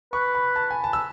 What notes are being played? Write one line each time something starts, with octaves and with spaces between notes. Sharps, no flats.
B4 C#6
B5
A5
G#5
A5
E6